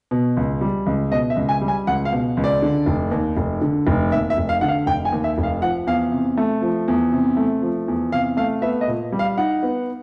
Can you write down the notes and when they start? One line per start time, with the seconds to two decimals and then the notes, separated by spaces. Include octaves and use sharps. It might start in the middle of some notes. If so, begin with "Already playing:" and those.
0.11 B2
0.37 C#2
0.61 G3
0.86 C#2
1.11 B2 D#5
1.30 E5
1.36 C#2
1.49 G#5
1.61 G3
1.68 G#5
1.87 C#2 F#5
2.05 F5
2.12 B2
2.37 C#2
2.44 D5
2.62 D3
2.86 F1
3.11 D#2
3.37 F1
3.61 D3
3.87 F1
4.12 D#2 E5
4.30 E5
4.37 F1
4.49 F5
4.61 D3 F#5
4.68 F5
4.86 F1 G5
5.05 G#5
5.12 D#2
5.24 E5
5.38 F1
5.43 F5
5.62 F3 F#5
5.87 E2 F5
6.12 C3
6.37 A3
6.62 F3
6.88 E2
7.12 C3
7.37 A3
7.62 F3
7.88 E2
8.12 C3 F5
8.37 A3 F5
8.62 B3 E5
8.81 D#5
8.88 A#2
9.12 G3
9.19 F5
9.38 D#4 F#5
9.63 B3